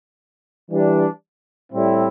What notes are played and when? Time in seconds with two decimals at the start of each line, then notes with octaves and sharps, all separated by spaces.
0.69 E3 G3 D4 G4
1.71 A2 G3 C4 E4